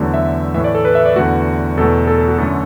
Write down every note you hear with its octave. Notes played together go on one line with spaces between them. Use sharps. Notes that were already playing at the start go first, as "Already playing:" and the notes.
Already playing: E2 D3 F#3 A3
E5
A2 E3 A3 E5
D5
A4
B4
E5
D5
E2 D3 A3 F#4
E2 B2 A3 A4
A4
A4
F#4
F#2 D3 A3 A4